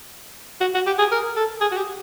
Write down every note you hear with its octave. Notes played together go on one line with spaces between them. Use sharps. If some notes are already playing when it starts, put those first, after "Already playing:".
F#4
F#4
G4
G#4
A#4
A4
G#4
F#4
G4